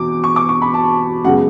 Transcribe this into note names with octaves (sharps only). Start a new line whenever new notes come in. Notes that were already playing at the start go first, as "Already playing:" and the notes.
Already playing: E2 B2 D6
C#6
D6
C#6
B5
A5
F#2 C#3 G#3 B3 F#5